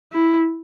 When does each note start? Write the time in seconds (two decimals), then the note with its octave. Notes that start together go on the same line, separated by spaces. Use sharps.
0.12 E4